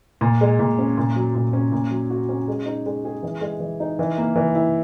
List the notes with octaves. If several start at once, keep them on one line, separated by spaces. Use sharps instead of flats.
A#2
G#3
A#2
C#4
A#2
F#3
A#2
C#4
A#2
F#3
F#4
C#4
G#3
D#4
G#3
G#4
E3
G#3
E3
D#4
E3
A#3
E3
E4